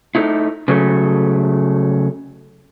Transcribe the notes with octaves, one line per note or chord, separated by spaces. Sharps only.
A3 D#4 E4
C#3 F#3 A3